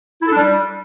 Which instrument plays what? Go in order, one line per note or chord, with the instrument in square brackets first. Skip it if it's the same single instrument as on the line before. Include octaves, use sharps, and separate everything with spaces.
[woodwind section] E4
A4
D4
G3